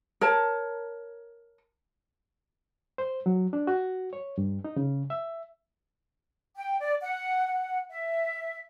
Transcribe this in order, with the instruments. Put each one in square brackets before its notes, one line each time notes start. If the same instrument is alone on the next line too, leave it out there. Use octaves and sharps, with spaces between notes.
[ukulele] A#4 C#5 A5
[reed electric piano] C5
F#3
D4
F#4
C#5
G2
D#4
C#3
E5
[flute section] G5
D5
F#5
F#5
E5